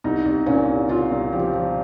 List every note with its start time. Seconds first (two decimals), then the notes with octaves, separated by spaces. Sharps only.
0.04 C2 D#4
0.25 C2
0.46 A#2 C#4
0.68 C2
0.89 C2 F4
1.11 C2
1.32 F3 G4
1.53 F3